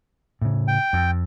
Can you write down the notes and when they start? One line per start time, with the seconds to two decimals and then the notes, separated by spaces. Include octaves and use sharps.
0.42 A2 C#3
0.68 G5
0.93 F2